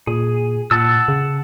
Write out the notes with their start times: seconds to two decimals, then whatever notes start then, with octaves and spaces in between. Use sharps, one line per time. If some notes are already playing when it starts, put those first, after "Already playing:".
0.07 A#2 G#4
0.71 A#2 F#5 A5 E6
1.08 C#3